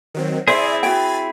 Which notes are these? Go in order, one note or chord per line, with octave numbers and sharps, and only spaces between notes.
D#3 F#3 C4
C4 E4 G#4 C5 D5 E5 G#5
F#4 G5 G#5 B5 A6